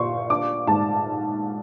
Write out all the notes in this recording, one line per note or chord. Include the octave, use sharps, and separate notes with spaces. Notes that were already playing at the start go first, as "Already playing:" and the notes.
Already playing: A#2 C6 C#6
D4 D6
G#2 A5